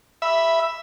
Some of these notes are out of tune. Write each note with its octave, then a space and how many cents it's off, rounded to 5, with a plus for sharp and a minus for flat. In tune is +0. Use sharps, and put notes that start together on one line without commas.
E5 +5 B5 +0